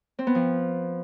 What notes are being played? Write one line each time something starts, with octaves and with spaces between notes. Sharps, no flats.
C4
B3
F3